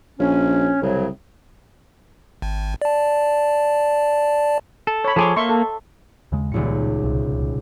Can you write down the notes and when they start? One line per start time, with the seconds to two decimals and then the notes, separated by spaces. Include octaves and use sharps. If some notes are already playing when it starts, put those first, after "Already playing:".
0.19 A#1 C#4
0.82 C2 A2 C#3 F#3
2.42 G#1
2.82 D5 A5
4.87 A4
5.04 C#5 B5
5.16 F3 G#4 A4 C#5 C6 D6
5.36 A#3 E5 C6 C#6
5.49 A4
6.32 D#2 C#3 G#3
6.52 D#1 C#2 A#2 C#7
7.03 C2 C3